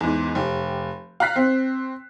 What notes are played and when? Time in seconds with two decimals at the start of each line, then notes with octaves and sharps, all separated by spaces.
0.01 E2 G#2
0.35 F1 G4
1.20 F5 A#5 F#6 B6 C7
1.36 C4